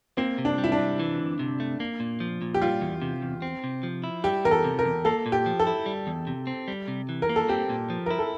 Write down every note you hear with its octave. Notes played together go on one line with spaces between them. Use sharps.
A#3 C4
C3
D4
G3
E4
D4
C3
E3
D2
C3
A3
A#3
A#2
F3
A#2
G4
G3 F4
E2
C3
E2
C4
C3
F3
E4
G3 G4
E2 A#4
A4
C3
A#4
E2
A#3 A4
A#2
G4
F3
A4
E4
G3
E2
C3
C4
G3
C3
E3
A#4
A#3
A4
C4 G4
A#2
F3
E4 A#4
A4